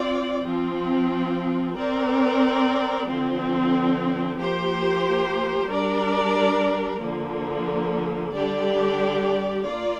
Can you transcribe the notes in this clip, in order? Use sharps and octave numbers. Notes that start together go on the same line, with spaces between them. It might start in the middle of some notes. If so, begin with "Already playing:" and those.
Already playing: C4 F4 D5
F3 C4 F4
C4 A#4 D5
D3 F3 C4
F3 A#3 G4 C5
G3 D4 A#4 D5
D3 F3 A#3
D3 G3 D4 G4 D5
A#3 F4 D5